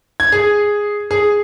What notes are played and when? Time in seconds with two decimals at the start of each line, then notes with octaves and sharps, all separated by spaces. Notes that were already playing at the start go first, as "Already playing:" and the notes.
0.20 G#6
0.32 G#4
1.11 G#4